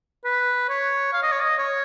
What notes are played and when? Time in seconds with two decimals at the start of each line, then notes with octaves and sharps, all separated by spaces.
0.24 B4
0.69 C#5
1.13 F5
1.23 D#5
1.32 C#5
1.41 D#5
1.58 C#5